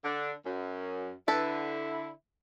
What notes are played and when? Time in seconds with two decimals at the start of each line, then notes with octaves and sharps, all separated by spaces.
0.04 D3 D4
0.46 F#2
1.28 D3 E4 A4 B4